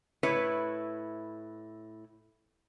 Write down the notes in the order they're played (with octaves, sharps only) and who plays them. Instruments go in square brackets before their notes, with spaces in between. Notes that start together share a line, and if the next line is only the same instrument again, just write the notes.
[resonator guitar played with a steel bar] A2 E4 B4 C#5